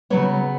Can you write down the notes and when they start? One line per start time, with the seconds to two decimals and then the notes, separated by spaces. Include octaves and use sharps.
0.10 C#3 F#3 B3 C#5